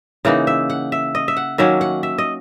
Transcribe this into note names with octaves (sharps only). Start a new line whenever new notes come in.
C#3 E3 A#3 D#4 F#5
E5
F#5
E5
D#5
E5
F#5
D#3 F#3 A#3 C#4 E5
F#5
E5
D#5